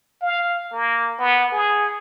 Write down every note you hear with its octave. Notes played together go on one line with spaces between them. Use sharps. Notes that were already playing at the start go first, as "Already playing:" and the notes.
F5
A#3
B3
G#4